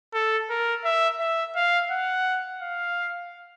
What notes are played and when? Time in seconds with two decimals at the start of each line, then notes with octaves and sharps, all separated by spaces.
0.14 A4
0.50 A#4
0.85 E5
1.20 E5
1.56 F5
1.91 F#5
2.62 F5